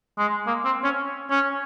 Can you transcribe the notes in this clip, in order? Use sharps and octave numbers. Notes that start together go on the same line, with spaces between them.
G#3
A#3
C4
C#4
C#4